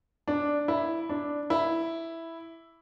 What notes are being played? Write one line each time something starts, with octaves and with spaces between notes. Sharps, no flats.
D4
E4
D4
E4